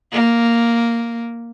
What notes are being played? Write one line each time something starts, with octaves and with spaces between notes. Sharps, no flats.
A#3